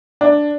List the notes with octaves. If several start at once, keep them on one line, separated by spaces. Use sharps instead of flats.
D4